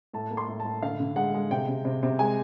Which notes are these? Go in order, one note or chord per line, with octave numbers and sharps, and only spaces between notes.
A2 A5
A#3
C6
A2
A5
A2
D3 F5
D3
G#3 F#5
G#3
C3 G5
C3
C3
C3
G#3 G#5